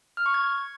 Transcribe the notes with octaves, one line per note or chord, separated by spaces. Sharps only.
F6
C#6
G#6